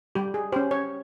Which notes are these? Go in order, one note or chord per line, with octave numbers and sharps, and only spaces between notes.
G3 G4
G#4
C#4 G4 C5
C#5